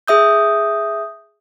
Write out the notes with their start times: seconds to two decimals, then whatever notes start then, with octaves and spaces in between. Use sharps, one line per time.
0.08 G#4 E5 D#6 G6